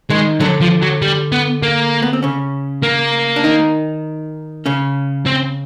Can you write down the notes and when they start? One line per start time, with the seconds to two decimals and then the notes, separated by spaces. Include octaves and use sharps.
0.10 D#3 G#3 D#4
0.41 D3 F#3 D4
0.61 F3
0.82 F#3
1.02 G3
1.32 B3
1.62 A#3
2.02 B3
2.13 C4
2.23 C#3 C#4
2.83 A#3
3.36 D4
3.44 D#3 D#4
4.66 C#3 C#4
5.26 C4